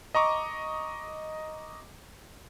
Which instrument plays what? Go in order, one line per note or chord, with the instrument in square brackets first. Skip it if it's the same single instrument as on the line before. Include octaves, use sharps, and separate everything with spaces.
[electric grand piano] D#5 A#5 C#6 D6